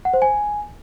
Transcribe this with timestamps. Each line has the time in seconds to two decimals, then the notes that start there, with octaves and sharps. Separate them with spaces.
0.05 F#5
0.13 C5
0.22 G#5